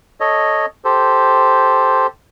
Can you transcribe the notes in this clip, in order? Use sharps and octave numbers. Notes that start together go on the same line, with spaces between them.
A4 C#5 D#5
G4 A4 C5